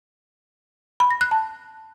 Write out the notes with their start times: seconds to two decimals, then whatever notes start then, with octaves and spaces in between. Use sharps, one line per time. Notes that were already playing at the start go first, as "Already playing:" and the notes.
1.00 B5
1.11 A#6
1.21 F#6
1.31 A5